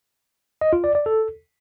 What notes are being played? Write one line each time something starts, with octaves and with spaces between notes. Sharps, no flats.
D#5
F4
D5
D5
A4